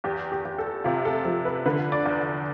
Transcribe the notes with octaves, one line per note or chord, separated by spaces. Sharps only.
E2 G4
G4
E2
A4
C3 F4
A4
F3 A4
B4
D3 B4
D5
E2